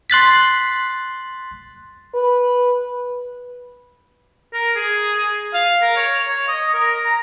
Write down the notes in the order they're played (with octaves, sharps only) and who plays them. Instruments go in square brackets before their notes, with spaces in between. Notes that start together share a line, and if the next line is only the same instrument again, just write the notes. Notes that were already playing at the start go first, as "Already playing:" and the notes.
[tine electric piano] C6 F#6 A6 B6
[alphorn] B4
[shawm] A#4
G#4
F5
A#4
C#5
C#5
D#5
A#4
A#5